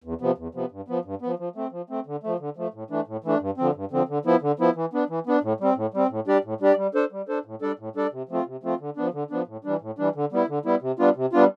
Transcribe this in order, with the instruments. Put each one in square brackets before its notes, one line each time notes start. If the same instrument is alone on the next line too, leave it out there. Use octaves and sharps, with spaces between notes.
[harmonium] E2
C3 F3 B3
E2
C3 F3 B3
G2
F3 B3
G2
F3 B3
F3
A3 C4
F3
A3 C4
D3
F3 A3
D3
F3 A3
A2
E3 A3 D4
A2
E3 A3 D4
G2
D3 F3 C4
G2
D3 F3 C4
D3
F3 B3 E4
D3
F3 B3 E4
E3
B3 D4
E3
B3 D4
A2
G3 C4
A2
G3 C4
A2
G3 D4 G4 D5
A2
G3 D4 G4 D5
G3
D4 A4 C5
G3
D4 A4 C5
A2
G3 D4 A4 D5
A2
G3 D4 A4 D5
C3
F3 A3 C4 F4
C3
F3 A3 C4 F4
D3
F3 B3 D4
D3
F3 B3 D4
A2
E3 G3 D4
A2
E3 G3 D4
D3
G3 B3 E4
D3
G3 B3 E4
C3
G3 B3 D4 F4
C3
G3 B3 D4 F4